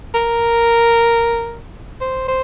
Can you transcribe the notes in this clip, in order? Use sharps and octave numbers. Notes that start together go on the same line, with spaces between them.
A#4
C5
C5